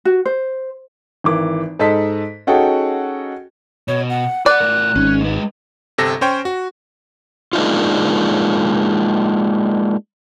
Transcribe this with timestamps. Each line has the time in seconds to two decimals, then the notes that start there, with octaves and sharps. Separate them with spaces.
0.05 F#4
0.25 C5
1.24 G#1 E3 A#4 D6
1.79 G#2 A4 D#5 A5 B6
2.47 C#4 D#4 F#4 G#4 A4 G5
3.88 B2 C#5
4.10 F#5
4.46 B4 D5 F#5 F#6
4.60 A2 A#4
4.96 G#1 G#2 C#4
5.21 G#3 B4
5.98 G1 C3 A4 A#6
6.21 C#4 C5 C#5 G5
6.45 F#4
7.53 G#3 A#3 D4 D#4 F4